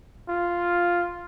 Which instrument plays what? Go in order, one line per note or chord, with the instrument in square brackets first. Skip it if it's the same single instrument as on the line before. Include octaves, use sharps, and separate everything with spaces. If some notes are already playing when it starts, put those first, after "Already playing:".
[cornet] F4